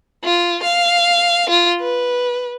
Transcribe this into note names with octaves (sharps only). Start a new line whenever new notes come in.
F4
F5
F4
B4